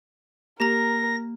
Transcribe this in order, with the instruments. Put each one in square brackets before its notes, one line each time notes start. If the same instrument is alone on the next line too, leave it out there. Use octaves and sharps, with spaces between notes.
[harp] A#3 [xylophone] G4 A#5 [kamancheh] A#4 [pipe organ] A#6